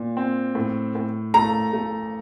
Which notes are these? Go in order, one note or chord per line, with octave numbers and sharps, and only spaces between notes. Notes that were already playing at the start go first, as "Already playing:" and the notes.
Already playing: A#2
C4
A2
A2
A3 A#5
A3